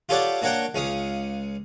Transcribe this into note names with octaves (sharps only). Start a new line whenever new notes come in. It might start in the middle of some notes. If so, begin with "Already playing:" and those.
F4 G4 A4 C#5 D5 F#5
A#3 D4 F#4 C#5 F#5 G5
C#2 C#4 F5 D#6